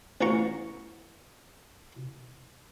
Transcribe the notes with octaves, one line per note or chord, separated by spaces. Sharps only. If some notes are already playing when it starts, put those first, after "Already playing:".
A1 E2 D3 F4 A#5 C#6